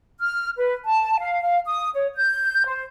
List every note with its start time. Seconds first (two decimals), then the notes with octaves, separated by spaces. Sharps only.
0.20 F6
0.58 B4
0.85 A5
1.20 F5
1.42 F5
1.66 D#6
1.94 C#5
2.15 G6
2.66 C5